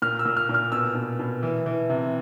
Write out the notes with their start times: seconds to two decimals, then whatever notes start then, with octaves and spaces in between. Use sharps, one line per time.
0.02 A#2 F6
0.19 E6
0.26 A#2
0.37 F6
0.49 A#2
0.54 F6
0.72 B2 E6
0.95 B2
1.19 B2
1.43 E3
1.66 E3
1.89 C3